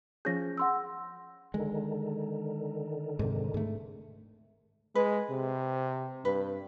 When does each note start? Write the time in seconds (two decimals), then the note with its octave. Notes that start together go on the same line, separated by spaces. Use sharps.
0.25 F3 C#4 G#4 G6 A#6
0.58 F#5 C6 E6
1.54 D3 D#3 G#3
3.19 G#2 C3
3.54 G#2 A3
4.95 G#3 B4
5.30 C3
6.25 G2 B4